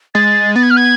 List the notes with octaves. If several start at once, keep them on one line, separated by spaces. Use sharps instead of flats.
G#3 A6
B3 A6
G#6
F6
G#6